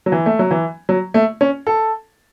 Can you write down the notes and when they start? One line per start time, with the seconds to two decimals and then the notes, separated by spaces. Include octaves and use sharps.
0.06 F#3
0.12 E3
0.26 A3
0.39 F#3
0.51 E3
0.89 F#3
1.14 A3
1.41 C#4
1.67 A4